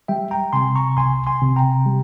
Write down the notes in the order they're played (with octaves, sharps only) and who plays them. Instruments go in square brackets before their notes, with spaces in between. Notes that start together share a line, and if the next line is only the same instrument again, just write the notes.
[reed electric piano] G3 [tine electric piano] E5 G5
[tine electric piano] G5 A#5
[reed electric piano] C3 [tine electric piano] G#5 C6
[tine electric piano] A#5 C#6
[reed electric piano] C2 [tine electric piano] G#5 C6
[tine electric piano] G#5 C6
[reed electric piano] C3
[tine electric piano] G5 A#5
[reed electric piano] G3